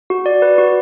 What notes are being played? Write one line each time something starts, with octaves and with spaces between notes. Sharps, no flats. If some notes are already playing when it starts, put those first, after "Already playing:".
F#4
D5
B4
F#4